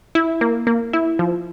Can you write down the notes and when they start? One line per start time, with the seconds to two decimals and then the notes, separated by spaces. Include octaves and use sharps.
0.15 E4
0.41 A#3
0.67 A#3
0.93 E4
1.19 F3